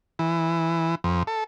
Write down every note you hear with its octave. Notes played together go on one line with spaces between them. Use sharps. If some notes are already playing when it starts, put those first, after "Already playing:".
E3
F2
A4